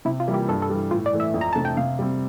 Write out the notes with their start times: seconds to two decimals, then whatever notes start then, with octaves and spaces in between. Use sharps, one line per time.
0.05 C3 E4
0.20 F4
0.27 E3 G3 A#3 E4
0.34 G4
0.48 G2 A4
0.62 A4
0.70 E3 G3
0.91 A2 F4
1.06 D5
1.13 E3 A3
1.20 E5
1.34 F2
1.41 A#5
1.53 C3 E3 A3 D4 A5
1.65 G5
1.77 C3 F5
1.99 G3 C4